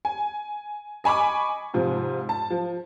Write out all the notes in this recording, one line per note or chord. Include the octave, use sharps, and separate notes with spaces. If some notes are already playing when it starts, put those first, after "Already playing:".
G#5
D#5 G#5 B5 C#6 D6
G#2 C3 F3
A5
F3